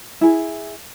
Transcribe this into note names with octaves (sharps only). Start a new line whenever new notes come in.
E4 G#4